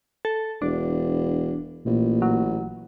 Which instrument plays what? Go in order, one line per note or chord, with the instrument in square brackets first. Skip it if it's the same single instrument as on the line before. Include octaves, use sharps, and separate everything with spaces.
[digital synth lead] A4
[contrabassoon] E1 [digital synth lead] D4
[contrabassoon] A1 [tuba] A#2
[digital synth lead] F#3